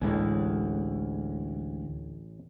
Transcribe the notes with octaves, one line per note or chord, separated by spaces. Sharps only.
A1 D2 A2 G#3 G#5